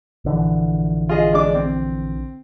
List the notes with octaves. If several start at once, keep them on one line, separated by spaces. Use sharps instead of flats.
A#1 D3 E3
F4 G#4 D#5
G#3 D4 D6
C4